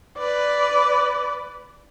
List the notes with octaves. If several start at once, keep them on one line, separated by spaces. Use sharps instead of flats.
B4 D5